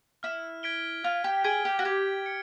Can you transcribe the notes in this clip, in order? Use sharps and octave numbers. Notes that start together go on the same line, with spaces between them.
E4 F6
G#6 B6 D7 G7
F4 F6
G4
G#4 G#6 B6 D7 G7
G4
F#4
G4 G#6
C#7